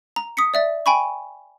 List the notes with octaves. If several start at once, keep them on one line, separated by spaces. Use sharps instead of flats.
A#5
D#6 B6 C#7
D5 E5 A6
G5 G#5 B5 C#6